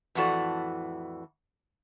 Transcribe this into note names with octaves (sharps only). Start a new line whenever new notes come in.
F2 A2 E3 F#4 A4 D5